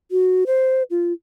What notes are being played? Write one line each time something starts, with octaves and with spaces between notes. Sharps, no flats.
F#4
C5
F4